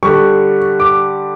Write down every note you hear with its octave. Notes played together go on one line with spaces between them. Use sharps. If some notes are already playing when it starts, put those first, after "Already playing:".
D3 G3 C#6
D6